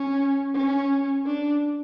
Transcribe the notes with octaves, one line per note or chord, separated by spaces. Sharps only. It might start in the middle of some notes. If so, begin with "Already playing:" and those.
Already playing: C#4
C#4
D4